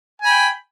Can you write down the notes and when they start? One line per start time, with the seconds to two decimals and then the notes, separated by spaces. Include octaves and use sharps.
0.22 G#5
0.26 B5
0.30 G5